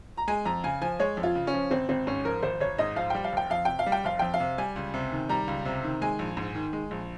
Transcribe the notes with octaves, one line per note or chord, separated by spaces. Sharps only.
A#5
G#3 G#5
F2 A#5
C#3 G#5
F3 G#5
G#3 C#5
F2
F4
C#3
C#4
F3
G#1 C4
G#1 C4
G#2 C#4
F3 A#4
G#1 C5
G#1 C#5
G#2 D#5
F3 F5
G3 G5
F5
F1 G5
F2 F5
C3 G5
F5
G3
G5
F1 F5
F2 G5
F5
C3
G3 G#5
C#2
C3
D#3
G3 A#5
C#2
C3
D#3
G#3 G#5
A#1
G#2
D#3
G#3
A#1